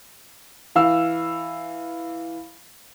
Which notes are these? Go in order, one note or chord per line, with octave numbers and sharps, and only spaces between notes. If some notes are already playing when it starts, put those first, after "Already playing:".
E3 F5 E6